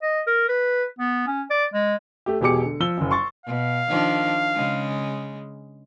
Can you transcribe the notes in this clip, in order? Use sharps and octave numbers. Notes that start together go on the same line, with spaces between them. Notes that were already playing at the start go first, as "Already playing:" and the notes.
D#5
A#4
B4
B3
C#4
D5
G#3
A3 G4
E1 B2 G4 G#4 D6 C#7
D3
F3 E6 G7
F#1 F#2
C6 C#6 A6
B2 F5
D#3 F3 D4
C#3 G#3